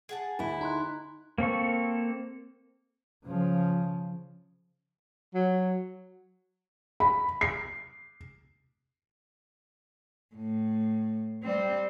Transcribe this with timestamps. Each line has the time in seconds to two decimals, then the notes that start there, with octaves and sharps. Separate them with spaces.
0.09 G#4 F#5 A5
0.39 D2 E4
0.61 D#4 A#5 C6 F#6
1.38 A#3 C4 A4 C#6
3.26 C#3 F3
5.34 F#3
7.00 B5
7.41 C7
10.35 A2
11.43 G3 C4